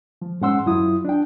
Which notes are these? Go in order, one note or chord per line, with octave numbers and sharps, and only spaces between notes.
F3
G#2 C#4 F#5 C6 E6
F#2 F#3 E4 F4 D#6
D4 G5